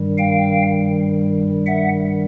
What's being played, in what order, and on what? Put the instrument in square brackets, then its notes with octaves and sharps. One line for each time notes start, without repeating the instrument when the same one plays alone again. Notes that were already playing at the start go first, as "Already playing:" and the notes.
Already playing: [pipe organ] G2 D#3 G3
F5 G5
E5 F#5